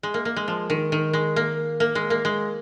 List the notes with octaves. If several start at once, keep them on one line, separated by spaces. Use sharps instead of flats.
G#3
A#3
A#3
G#3
F3
D#3
D#3
G#3
A#3
A#3
G#3
A#3
G#3